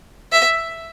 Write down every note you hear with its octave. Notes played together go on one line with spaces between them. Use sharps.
E5